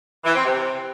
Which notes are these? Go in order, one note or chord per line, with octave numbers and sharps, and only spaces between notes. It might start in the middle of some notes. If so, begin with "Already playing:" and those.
E3
C4
C3